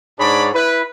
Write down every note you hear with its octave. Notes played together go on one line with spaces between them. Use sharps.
G#2 D4 G#4 C#5 D5 B5
E4 B4